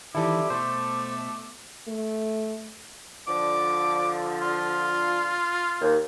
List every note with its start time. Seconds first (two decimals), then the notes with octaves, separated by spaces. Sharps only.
0.15 F2 C3 D#3 E3 G3 E4 A4 D6
0.50 B2 A3 C5
1.88 A3
3.28 D3 F3 D6
4.41 F4
5.81 D#2